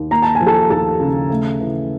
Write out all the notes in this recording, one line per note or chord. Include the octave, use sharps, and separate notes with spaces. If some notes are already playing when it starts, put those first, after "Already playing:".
Already playing: D#2
A#3 A#5
A5
G#5
F3
A4 A5
D#2 A4 A5
C#3
A3
E3